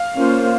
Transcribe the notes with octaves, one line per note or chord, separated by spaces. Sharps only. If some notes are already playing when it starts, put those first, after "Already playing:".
Already playing: F5
A#3 C#4 F4 C5